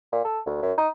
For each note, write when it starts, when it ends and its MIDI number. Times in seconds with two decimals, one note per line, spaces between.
0.12 0.24 46
0.25 0.38 69
0.46 0.60 38
0.62 0.72 42
0.77 0.88 63